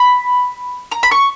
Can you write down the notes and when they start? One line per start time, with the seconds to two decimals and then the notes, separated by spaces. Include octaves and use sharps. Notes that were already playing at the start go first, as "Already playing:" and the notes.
Already playing: B5
0.92 A#5
1.03 B5
1.11 C#6